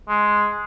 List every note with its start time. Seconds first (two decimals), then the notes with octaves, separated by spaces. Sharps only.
0.09 G#3